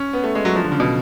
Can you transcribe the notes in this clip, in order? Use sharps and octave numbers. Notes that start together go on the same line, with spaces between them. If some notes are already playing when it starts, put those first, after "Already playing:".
Already playing: C#4
B3
A3
G#3
F#3
F3
D3
C#3
B2